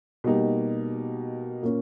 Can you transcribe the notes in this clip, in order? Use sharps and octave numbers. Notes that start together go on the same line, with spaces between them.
B2 G3 A#3 D#4 G4
A#2 A#3 C#4